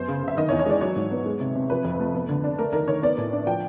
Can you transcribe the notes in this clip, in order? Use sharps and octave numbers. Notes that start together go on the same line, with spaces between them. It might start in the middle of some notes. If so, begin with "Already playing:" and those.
Already playing: F#2 B3 C5
C#3
C#3
E5
D#3 D#5
C#5
E2
C#5
G#3 D5
F#3 C#5
G#2
B3
G#3
C3
C3
F3 B4
F2
A3
B3
D3
D4
A3 A#4
D#3 A#4
D#3 C#5
B3 D5
A2
D4
F3 G5